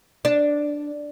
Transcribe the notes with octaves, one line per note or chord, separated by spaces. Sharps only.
D4